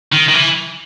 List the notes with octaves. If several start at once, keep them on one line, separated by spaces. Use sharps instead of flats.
D#3
D#3
E3